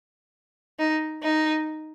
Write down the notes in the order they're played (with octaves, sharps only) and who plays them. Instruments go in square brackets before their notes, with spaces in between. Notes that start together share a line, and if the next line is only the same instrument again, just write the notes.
[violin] D#4
D#4